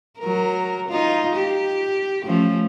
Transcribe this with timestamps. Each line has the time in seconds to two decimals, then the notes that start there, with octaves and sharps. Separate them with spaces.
0.19 F#3 A#4
0.89 D#4 F4
1.36 G4
2.25 F3 A3 C#4